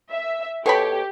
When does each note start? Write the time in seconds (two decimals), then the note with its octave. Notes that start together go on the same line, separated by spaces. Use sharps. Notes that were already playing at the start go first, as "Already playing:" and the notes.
0.12 E5
0.66 B2 G4 A4 C#5 B5